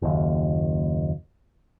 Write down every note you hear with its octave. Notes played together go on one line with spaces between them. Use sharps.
F#1 D#2